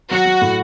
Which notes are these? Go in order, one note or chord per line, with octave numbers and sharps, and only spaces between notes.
F#3 F#4
F#3
A2